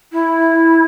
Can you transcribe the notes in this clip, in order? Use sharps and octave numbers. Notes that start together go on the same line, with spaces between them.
E4